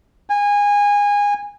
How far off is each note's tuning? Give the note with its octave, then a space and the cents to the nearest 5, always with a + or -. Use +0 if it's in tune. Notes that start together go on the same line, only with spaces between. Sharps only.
G#5 -20